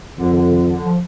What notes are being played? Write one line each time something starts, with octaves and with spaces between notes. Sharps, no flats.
F2 D3
D3
D3
D3
F3